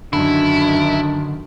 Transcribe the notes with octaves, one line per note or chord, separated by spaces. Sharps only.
F#2 D3 D#3 D4 E4